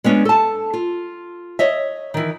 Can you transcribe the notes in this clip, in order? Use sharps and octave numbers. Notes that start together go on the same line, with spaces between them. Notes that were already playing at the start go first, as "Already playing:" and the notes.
G#3 B3 C#4 D4
A4 A5
F4
C#5 D#5 E5
D#3 E3